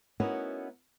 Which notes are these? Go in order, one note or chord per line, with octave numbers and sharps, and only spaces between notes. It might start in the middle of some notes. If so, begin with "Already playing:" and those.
B3 C#4 D#4 E4 F#4 A#4